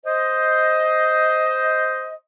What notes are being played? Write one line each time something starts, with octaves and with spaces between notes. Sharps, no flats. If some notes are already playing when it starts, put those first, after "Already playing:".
C5 D#5